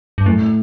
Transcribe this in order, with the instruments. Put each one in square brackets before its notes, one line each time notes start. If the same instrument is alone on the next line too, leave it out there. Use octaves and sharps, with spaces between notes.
[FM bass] G2
[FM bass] F#2 [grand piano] A2